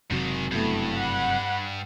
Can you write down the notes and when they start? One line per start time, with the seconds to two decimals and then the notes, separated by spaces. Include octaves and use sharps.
0.11 F#1 G#2 C3 D#3 F#3
0.52 G2 A3 B3 E4
0.94 F#5 B5